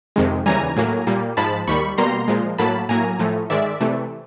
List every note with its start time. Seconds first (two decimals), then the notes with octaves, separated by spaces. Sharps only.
0.16 F2 C3 D#3 G#3
0.46 D#2 C#3 E3 G3 G#5 A#5
0.77 A2 F#3 A#3
1.07 A#2 G3 A#3
1.37 G#2 F3 G#3 A5 B5
1.68 D#2 D#3 G3 B5 C#6
1.98 B2 G3 A#3 A#5 C6
2.28 A#2 F3 G#3
2.58 A2 F#3 A#3 A5 B5
2.89 A2 F#3 A#3 G#5 A#5
3.19 A2 F3 A3
3.50 G#2 D#3 G#3 D5 E5
3.81 C3 E3 A3